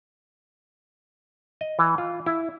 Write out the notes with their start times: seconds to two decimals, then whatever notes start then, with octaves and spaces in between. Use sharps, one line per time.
1.61 D#5
1.79 E3
1.98 F4
2.26 E4